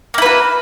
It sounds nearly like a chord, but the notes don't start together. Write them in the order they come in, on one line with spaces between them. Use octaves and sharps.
A#3 E4 B4 F#4